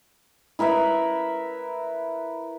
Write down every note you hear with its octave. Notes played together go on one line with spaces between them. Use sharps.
E4 A#4 B4 E5